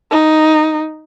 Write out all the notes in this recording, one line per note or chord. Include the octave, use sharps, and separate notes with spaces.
D#4